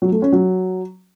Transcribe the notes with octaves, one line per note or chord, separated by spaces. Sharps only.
F#3
A3
C#4
F#3